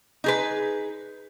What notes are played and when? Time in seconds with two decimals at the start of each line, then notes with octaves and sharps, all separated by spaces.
0.24 D#4 G#4 B4